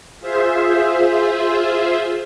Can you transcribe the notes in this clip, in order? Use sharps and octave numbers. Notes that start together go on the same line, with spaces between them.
F4 G#4 C5 E5